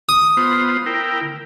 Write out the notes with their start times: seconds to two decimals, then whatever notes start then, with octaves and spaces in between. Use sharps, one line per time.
0.09 D#6
0.37 B3 F4 C5
0.86 E4 A#4 G5